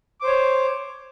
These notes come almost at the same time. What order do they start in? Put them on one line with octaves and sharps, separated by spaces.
D6 C5 C#5